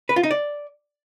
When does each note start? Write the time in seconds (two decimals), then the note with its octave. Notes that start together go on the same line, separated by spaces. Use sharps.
0.09 B4
0.16 F4
0.23 D#4
0.31 D5